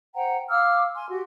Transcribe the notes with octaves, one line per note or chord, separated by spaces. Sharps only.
C5 F#5 G5 A#5
F5 D6 E6 F6
G#5 C6
F#4 G4